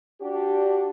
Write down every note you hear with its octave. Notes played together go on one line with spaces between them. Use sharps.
D4 F#4 G4